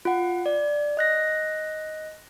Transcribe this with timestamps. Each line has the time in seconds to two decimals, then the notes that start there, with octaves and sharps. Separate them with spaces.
0.05 F4 F#5
0.46 D5
0.97 D#5 F#6 A#6